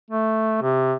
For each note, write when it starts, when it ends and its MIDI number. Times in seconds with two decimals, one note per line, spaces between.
0.11 0.59 57
0.62 0.94 48